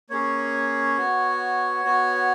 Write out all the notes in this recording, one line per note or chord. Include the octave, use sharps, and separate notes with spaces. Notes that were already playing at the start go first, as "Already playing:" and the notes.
A#3 C#4 G#4 C#5
B3 F#4
B3 F#4